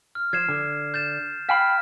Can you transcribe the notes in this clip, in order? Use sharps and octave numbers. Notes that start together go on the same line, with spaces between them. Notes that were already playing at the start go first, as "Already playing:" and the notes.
F6
F3 G#6 C7 E7
D3
G6 A6 E7
F5 G5 B5 F6 B6